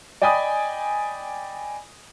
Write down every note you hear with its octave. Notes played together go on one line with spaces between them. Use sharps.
D5 D#5 G5 G#5 B5 D#6